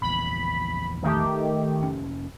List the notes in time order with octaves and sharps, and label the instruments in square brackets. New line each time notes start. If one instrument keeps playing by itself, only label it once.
[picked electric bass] A#1 E2 [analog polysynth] B5
[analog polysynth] D#3 A3 G4
[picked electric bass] F1 C#4